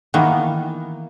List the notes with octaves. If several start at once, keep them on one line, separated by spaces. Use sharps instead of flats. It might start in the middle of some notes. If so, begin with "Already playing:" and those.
D#3 E3 A#3 B3